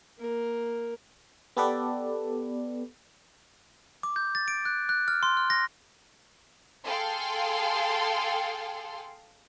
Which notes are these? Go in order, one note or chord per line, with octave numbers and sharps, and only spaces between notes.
A#3 A#4
B3 G4 A4 B4 D5
D6
G6
A6
D7
F#6
F#6
F6
C6
F6
A#6
G#4 A4 F5 G5 C6